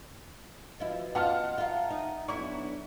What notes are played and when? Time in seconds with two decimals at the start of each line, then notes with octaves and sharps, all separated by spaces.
0.80 F3 E4 F#4 B4 D#5
1.15 B3 F4 F#5 A5 F6
1.58 F4 E5 F5 A#5
1.90 D#4
2.28 B1 D4 E4 C#6